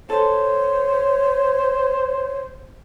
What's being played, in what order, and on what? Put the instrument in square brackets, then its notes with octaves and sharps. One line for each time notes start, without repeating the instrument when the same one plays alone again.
[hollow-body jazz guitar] A4 [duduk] C5 [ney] C#5